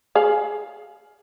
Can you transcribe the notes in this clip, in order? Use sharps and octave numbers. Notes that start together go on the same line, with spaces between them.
G#4 F5